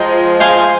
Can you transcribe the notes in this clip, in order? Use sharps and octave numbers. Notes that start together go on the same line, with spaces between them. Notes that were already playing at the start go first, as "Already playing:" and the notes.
Already playing: F3 G#3 D#5 G5 A#5
C5 F5 G#5 C6